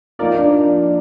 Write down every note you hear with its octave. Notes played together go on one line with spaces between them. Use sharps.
F3 A#3 D#4 F4 A#4 D5
D4